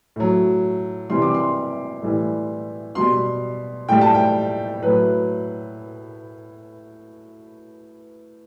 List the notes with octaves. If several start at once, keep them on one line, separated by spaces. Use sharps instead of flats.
A2 F#3
C3 E3 G3 C6
D6
C6
A2 E3 G3
B2 G3 C6
A2 G3 G5
A5
G5
A2 F#3 B4